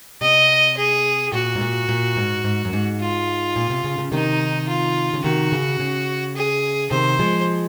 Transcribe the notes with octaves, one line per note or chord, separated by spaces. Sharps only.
C3 D#5
G#4
A#2 F#4
G#2
A#2
A#2
G#2
G#2
F#2
G#2
F4
A#2
C3
C#3
C#3
C3 D#3 D#4
F4
C#3
C3 D#3 F#4
C#3
C#3
G#4
C3 D#3 C5
F3 G#3